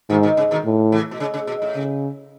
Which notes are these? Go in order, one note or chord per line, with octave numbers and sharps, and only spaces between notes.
G#2 B2 D#3
B2 D#3
C#3
B2 D#3
A2
C#3 E3
B2
C#3
C#3
B2
A2
C#3